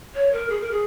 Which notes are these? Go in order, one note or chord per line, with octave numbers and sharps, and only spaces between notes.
C#5
A#4
G#4
A#4
G#4